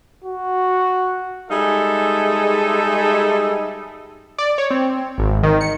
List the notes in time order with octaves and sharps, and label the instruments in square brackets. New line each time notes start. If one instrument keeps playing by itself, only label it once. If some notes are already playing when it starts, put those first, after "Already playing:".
[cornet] F#4
[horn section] G3 G#3 D#4 G#4 A4 E5
[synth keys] D5
C#5
C4
G#1
D#3
C#7